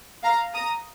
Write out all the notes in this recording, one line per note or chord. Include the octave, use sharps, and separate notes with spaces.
F5 A#5
A#5 D#6